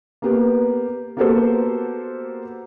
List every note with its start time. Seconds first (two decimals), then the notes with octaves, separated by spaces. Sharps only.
0.22 A#3 B3 G4
1.17 A#3 B3 F#4 G4 A4 C5